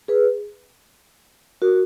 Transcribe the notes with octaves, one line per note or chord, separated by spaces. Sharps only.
G#4 B4
F#4 A#4